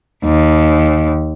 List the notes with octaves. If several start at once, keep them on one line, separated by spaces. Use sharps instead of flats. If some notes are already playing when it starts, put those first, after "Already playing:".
D#2